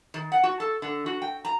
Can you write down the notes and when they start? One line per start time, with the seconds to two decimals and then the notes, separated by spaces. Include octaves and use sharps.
0.14 D#3
0.32 F#5
0.43 F#4
0.60 A4
0.82 D3
1.06 F#4
1.22 G5
1.45 A#5